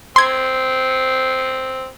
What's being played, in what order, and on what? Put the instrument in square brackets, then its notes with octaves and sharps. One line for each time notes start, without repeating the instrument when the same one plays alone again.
[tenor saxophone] C4 [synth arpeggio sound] C6 G#6